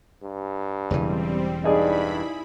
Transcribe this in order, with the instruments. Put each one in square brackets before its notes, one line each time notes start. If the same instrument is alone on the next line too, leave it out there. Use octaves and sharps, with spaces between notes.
[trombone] G2
[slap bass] E1 C#3 E3 [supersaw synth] G3 C4
[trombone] G2 [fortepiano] D#4 G#4 D5 [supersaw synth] E4 B5